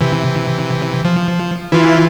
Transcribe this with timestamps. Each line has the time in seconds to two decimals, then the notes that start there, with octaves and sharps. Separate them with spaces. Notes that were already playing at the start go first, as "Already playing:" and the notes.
0.01 C3 E3
1.05 F3
1.72 E3 E4 F4